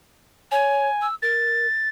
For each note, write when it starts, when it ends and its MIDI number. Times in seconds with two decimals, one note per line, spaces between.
0.51 0.89 73
0.51 1.07 80
1.01 1.15 88
1.22 1.67 70
1.22 1.89 93